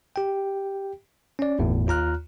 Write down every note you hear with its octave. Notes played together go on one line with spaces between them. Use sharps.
G4 G5
C#4 D5
G1 E2 A2
D#2 F4 A#5 F6 F#6